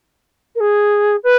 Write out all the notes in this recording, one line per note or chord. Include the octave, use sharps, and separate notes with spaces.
A#4
G#4
B4